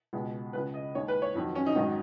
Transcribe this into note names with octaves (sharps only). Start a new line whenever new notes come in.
C#2 B2 G#3
C#2 C#3 G#3 B4
D#5
D#2 D#3 G#3 C#5
B4
C#5
F2 D#3 F#3
C#4
D#4
G#1 G#2 D#3 F#3